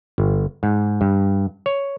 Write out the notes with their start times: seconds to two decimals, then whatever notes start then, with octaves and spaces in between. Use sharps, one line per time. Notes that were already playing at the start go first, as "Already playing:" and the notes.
0.18 G1
0.63 G#2
1.01 G2
1.66 C#5